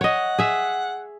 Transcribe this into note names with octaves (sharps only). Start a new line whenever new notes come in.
C#5 D#5 F#5
G#4 E5